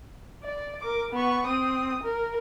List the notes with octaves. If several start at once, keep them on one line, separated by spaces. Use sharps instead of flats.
D5
A#4 D6
B3 C#6
C4 D#6
A#4